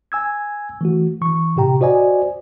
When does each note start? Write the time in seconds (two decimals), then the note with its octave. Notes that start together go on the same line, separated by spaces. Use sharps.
0.12 G#5 E6 G#6
0.81 E3 A3 F#4
1.21 E3 C#6
1.56 A2 C3 G4 G5 A#5
1.81 F#4 C5 D5 D#5 G#5